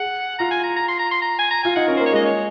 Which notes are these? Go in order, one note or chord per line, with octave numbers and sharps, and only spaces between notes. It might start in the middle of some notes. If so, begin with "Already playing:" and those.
Already playing: G#4 F#5
F4 A#5
G#5
A#5
A#5
C6
A#5
C6
A#5
G#5
A#5
F4 G#5
D#4 F#5
C#4 A#4
A#3 C5
C#5
G#3 D#5
C#5